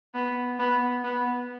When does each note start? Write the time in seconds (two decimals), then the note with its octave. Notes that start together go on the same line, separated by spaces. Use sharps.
0.14 B3
0.59 B3
1.04 B3